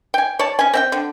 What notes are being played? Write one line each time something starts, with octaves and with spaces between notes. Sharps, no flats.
G5 G#5
C#5 D5 A5
C#4 G#5
C4 E5 G5
D3